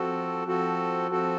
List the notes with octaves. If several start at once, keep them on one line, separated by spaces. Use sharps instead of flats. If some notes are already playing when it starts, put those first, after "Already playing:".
Already playing: F3 C4 F#4 A4
F3 C4 F#4 A4
F3 C4 F#4 A4